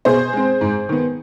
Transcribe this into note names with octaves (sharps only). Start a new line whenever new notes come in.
B2 G#4 C5
G#3 C4
G#2
D#3 B3